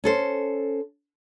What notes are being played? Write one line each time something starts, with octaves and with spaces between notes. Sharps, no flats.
C#4 A4 C5